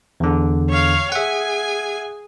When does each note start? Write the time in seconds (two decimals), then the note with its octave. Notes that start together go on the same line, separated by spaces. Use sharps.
0.20 E2 D3
0.69 C#5 F5
1.12 G#4 E5 F#5 G#5